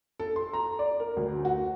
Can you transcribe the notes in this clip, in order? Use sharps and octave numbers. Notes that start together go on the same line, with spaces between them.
A4
C6
A#5
D5
A#4
D2
F#4